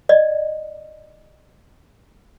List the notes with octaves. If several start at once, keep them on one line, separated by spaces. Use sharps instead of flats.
D5 D#5